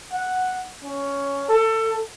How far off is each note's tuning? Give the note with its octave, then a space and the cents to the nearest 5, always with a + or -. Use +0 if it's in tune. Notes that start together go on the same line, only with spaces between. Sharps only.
F#5 -5
C#4 +10
A4 +25